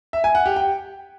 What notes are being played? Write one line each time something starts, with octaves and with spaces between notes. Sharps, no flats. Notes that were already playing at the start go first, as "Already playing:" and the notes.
E5
G#5
F#5
G4
G5